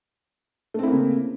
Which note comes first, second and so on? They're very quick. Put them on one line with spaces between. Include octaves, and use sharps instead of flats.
A3 C4 E4 A#3 C#3